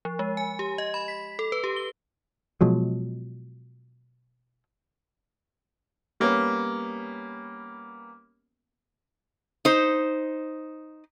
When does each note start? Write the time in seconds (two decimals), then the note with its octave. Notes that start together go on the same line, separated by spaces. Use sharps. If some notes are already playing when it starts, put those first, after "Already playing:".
0.05 F3
0.19 G#3
0.37 G#5
0.59 G4
0.78 D#5
0.94 B5
1.08 B6
1.39 A4
1.52 B4
1.64 G4
1.76 G7
2.61 B2 F3 F#3 G#3
6.20 G3 A#3 B3 C#4
9.65 D#4 C5